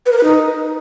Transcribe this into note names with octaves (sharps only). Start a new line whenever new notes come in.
B4
A#4
B4
D#4